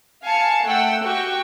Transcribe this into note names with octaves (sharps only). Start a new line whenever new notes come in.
F5 G#5 A5 C#7
A3 F#5 G5 E6
F#4 G4 G5 C#6